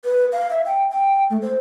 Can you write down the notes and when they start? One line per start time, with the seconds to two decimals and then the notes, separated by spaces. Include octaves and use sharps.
0.05 B4
0.32 F5
0.50 E5
0.66 G5
0.91 G5
1.30 A3
1.42 C5